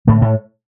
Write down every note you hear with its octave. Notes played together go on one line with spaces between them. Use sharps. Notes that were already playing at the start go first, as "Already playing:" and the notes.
A2 D3 A3
A2 A3